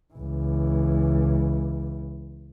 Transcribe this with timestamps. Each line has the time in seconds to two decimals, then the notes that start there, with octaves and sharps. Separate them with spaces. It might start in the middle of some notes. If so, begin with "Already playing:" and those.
0.13 C#2 E3